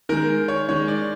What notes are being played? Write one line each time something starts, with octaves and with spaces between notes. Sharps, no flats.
D#3 G#3 A#4
C#5
D#3 G#3 C#5
D5